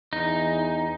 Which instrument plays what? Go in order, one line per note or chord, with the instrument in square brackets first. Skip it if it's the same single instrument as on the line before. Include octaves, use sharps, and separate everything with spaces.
[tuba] E2 [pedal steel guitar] D#4